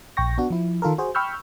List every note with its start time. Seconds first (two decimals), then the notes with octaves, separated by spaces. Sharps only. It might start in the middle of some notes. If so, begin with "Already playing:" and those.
0.17 A#1 G5 C#6 A#6
0.38 B3 D4 F#4
0.50 F3 E4
0.82 D#3 F4 A4 A#4
0.98 F#4 G#4 C5
1.15 G5 B5 C#6 E6 F6 G6